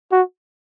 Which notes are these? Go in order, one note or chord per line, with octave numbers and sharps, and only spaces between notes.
F#4